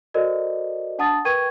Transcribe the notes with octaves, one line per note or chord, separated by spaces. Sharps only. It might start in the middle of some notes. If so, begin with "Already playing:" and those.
F#4 A4 A#4 C5 D5 D#5
D4 F#5 A5 D#6 A6
A#4 B4 G5 C#6 G#6 D#7